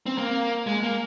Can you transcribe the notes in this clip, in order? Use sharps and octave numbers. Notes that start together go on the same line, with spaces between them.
C4
A#3
G#3
A#3